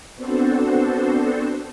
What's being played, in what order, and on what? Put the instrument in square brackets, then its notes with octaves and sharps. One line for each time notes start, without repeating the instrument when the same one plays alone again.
[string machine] B3 C4 D4 F#4 A4 C5